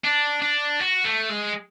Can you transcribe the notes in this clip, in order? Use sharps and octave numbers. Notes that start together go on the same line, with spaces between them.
D4
D4
F#4
A3
G#3